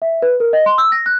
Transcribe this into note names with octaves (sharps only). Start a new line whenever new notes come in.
E5
B4
A#4
D#5
C6
E6
A#6
F#6